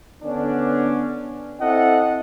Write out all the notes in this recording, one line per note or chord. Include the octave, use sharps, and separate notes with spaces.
D3 B3 C#4 D4
C4 E4 A4 D#5 F#5